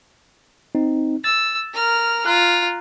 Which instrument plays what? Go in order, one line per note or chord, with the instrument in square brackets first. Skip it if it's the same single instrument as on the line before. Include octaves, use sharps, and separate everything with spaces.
[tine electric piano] C4 D#4
[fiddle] E6 [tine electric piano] A6
[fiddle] A#4 F6
[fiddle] F4 [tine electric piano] A#5 F#6